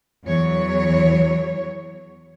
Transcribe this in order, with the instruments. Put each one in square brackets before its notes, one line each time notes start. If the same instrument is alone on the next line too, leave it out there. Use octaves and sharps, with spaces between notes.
[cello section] E2 E3 F#3 C#5